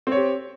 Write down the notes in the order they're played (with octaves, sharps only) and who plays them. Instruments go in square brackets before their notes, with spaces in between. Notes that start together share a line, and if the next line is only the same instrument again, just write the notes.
[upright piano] C4
C#5
G4